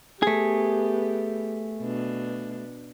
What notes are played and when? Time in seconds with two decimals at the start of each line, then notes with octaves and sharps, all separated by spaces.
0.23 A3 B3 G4 G#4
1.81 B2 D4